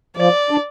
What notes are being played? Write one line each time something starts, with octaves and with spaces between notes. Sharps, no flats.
F3 D5
D4